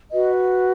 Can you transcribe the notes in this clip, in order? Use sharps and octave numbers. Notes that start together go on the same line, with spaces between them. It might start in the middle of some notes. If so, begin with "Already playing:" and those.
F#4 B4 D#5